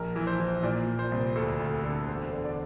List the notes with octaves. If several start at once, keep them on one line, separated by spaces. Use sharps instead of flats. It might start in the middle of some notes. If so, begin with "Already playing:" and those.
Already playing: A#1 A#4
E3
C5
E3
A#2 D5
A#2
C5
C2
D2 A4
D2
D3
E1 C5
D3
D5